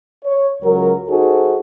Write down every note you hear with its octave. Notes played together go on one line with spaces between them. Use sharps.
C#5
C#2 F#3 A#4
D#4 F#4 G#4 A4 C5